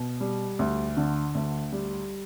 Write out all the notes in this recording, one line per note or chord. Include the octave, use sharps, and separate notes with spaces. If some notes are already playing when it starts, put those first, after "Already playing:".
Already playing: B2
G3
D2
D3
D2
G3